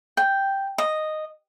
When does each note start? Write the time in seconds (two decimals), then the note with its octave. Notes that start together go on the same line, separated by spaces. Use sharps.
0.17 G5
0.78 D#5